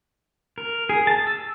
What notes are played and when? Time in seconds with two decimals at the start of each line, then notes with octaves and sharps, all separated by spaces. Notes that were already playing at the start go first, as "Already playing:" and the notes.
0.58 A#4
0.89 G#4
1.07 A5
1.27 E6